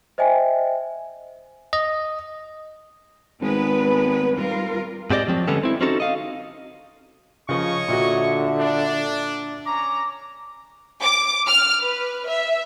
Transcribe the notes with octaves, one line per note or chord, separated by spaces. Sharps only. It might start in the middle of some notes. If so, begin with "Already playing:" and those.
C5 D#5 E5 G5 G#5
D#5
G#1 G#3 B3 B4
G3 F4 A#4
G#2 C4 G4 D5 D#5
F3 F#3 C4
D3 G3 G#3 B3 C#4 A4
C4 E4
C4 C#4 D#4 F#4 A4
D#5 F5
C#3 F3 C#5 D#5 C#6
A#2 D3 F#4 E5
D4
C#4 A#5 D6
D6
F6
B4
E5